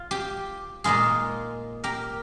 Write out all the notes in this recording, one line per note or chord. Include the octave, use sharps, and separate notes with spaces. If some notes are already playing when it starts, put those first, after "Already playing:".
Already playing: F4
G4
A#2 G#3 D#4 F4 G#4
G4 A#4